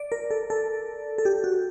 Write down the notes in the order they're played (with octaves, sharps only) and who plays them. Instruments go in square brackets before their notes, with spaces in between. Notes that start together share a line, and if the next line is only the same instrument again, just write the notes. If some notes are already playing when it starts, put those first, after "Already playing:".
Already playing: [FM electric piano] D5
A#4
A4
A4
A4
G4
F#4